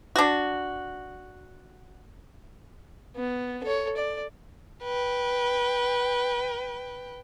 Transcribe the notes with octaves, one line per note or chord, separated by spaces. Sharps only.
D4 F#4
B3
A4 C#5
D5
B4 G5